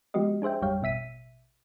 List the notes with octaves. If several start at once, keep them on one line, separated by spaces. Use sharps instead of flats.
F3 G#3 B3 F#4 G4 D#5
D4 G#4 C5 E5 G5
G#1 F2 G3 C#5 F5 G5
A1 B2 E5 B6 D#7